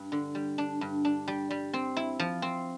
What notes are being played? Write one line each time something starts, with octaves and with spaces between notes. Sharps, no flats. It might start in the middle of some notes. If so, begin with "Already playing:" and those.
Already playing: G2
D3
G3
D4
G2
D4
G3
G3
C4
E4
F3
C4